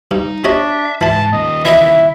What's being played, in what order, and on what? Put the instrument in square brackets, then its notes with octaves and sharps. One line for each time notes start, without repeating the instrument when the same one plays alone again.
[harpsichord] G2 [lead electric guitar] D#4
[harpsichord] C3 C#5 D#5 [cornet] D4 [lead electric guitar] E5
[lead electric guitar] G#2 [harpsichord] E3 B5 [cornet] A5
[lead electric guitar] A#2 D#3 [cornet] D#5
[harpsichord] E3 D#5 [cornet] E4 [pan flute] E5